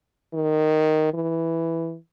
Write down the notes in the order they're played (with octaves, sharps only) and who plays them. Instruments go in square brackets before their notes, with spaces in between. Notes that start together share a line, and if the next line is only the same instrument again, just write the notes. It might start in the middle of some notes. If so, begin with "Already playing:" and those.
[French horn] D#3
E3